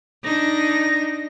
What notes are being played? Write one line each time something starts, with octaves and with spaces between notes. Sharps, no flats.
D4 D#4 A#6